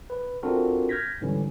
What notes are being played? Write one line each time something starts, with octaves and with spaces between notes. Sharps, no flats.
B4
C4 D4 F4 F#4 A4 A#4
F6 G6 G#6 A#6 B6
G#2 D3 E3 G3 C#4